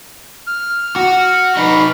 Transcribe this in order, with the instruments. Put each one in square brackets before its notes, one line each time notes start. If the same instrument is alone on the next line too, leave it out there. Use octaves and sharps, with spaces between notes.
[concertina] F6
[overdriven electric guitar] F#4
D#4 B4